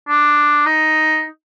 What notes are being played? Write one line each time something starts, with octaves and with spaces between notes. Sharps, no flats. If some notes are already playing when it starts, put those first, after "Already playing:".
D4
D#4